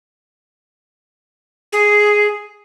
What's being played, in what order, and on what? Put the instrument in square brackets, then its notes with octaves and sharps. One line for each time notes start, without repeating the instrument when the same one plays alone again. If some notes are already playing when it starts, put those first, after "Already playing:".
[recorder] G#4